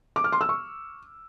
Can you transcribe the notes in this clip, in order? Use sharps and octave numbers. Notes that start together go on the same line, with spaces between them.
D6
F6
C6
E6
C#6